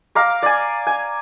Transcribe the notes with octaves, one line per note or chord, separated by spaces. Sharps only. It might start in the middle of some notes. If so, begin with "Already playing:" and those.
F5 A#5 D6
D5 G#5
G#5